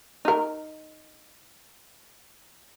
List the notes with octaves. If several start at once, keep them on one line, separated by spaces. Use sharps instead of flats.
D#4 A#4